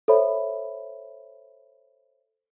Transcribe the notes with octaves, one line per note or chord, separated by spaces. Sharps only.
A4 C5 C#5 E5 B5